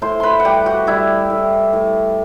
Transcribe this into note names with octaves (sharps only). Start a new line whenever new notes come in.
A2 C5 C6
B4 B5 C6
F#5
G3 G4 G5
F#4 F#5
G3 E4 E5
A2
A2